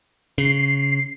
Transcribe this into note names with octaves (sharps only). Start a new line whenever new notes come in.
C#3 C7